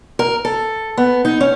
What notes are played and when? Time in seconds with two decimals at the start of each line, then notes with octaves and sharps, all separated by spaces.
0.19 A#4
0.45 A4
0.97 B3
1.25 D#4
1.41 C#4